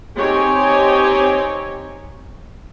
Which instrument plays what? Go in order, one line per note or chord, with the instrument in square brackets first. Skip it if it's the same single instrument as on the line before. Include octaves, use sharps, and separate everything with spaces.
[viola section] C4 D#4 G4 C#5 G#5